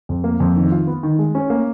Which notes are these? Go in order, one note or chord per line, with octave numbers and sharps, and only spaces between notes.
F2
A#3
F2
D#3
F4
B3
D#3
G#3
C#4
A#3